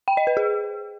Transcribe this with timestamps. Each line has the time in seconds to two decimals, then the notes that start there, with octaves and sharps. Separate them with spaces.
0.08 G5
0.17 D#5
0.27 B4
0.37 G#4